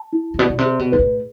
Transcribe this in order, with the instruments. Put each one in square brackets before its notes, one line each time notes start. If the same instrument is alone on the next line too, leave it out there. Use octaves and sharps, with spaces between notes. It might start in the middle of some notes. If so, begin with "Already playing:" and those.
Already playing: [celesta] A5
E4
[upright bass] A2
[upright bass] B2 [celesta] D5
[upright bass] B2
C3
[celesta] G#4
[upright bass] B2
[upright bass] G#2 [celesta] B4
[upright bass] A2